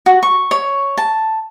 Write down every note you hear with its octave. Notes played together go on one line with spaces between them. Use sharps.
F#4
C#6
C#5
A5